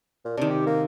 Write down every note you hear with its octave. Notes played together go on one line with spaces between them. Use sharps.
A#2
C3 D#3 D4
G4
A#3